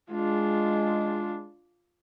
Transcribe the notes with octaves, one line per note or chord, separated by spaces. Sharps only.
G#3 D4 F4